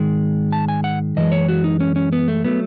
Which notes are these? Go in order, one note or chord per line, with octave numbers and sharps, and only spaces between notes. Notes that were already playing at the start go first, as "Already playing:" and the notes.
Already playing: G#2 D#3 G#3
A5
G#5
F#5
F#2 E3 G#3 D#5
C#5
F#4
D#4
C#4
C#4
B3
A3
F#3 A3 B3